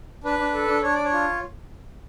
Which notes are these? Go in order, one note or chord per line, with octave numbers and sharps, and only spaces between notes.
D4 B4
D4
A4
D4
D4 C#5
D4 D5
C#5
F4